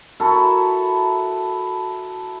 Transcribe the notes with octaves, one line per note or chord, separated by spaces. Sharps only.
E4 F#4 A4 A#4